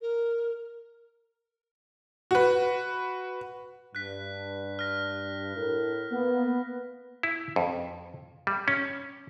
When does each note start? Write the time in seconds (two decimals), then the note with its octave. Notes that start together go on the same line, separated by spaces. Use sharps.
0.01 A#4
2.31 F#4 B4
3.95 G2 F#6 B6
4.79 F6 A#6
5.56 A2 A#4
6.12 A#3 B3
7.23 E4
7.56 F2
8.47 G3
8.68 C#4